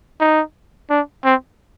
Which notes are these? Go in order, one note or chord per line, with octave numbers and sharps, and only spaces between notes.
D#4
D4
C4